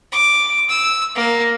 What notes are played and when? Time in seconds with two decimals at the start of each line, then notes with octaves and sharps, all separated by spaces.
0.12 D6
0.69 E6
1.16 A#3